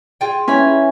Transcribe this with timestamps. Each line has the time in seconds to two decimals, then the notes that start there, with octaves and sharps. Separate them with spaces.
0.21 F4 G#4 G5
0.48 E3 C#4 G#5 B5